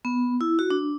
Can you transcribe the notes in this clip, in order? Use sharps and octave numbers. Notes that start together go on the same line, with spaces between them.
B3
E4
F#4
D4